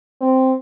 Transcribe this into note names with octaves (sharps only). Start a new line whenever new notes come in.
C4